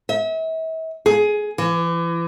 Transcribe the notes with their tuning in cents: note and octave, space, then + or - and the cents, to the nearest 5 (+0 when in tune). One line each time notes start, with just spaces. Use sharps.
E5 -40
G#4 +15
E3 +35